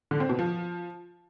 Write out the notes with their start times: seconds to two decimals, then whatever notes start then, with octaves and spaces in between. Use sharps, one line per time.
0.11 D3
0.20 C4
0.29 B2
0.39 F3